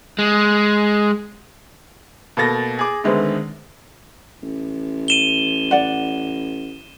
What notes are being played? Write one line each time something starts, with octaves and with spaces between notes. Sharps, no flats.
G#3
B2 A#3 A4 A6 A#6
G#4 D6
D3 D#3 G#3 A3 B3 C4
A1
D#7 E7 G7
D5 F#5